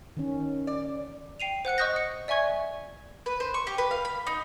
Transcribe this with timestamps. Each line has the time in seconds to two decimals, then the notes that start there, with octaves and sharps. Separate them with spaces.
0.17 D#3 C#4
0.67 D5
1.40 G5 C7 D#7 F7
1.65 C5 F#5 F#6 C#7
1.78 D#5 C#6 D#6 F#6 G6 A#6
1.96 C#7
2.28 D5 E5 G#5 C#6 G#6
3.26 B4
3.40 C5
3.54 C#6
3.67 G4
3.78 B4
3.91 F5
4.05 B5
4.27 D#4